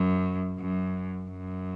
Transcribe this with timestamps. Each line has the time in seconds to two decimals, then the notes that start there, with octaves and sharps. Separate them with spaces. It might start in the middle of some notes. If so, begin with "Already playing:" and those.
Already playing: F#2
0.58 F#2
1.30 F#2